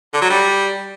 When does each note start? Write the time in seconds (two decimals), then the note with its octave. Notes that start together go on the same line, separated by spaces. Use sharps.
0.13 D3
0.22 F#3
0.30 G3